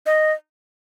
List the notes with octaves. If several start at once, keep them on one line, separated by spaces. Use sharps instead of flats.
D#5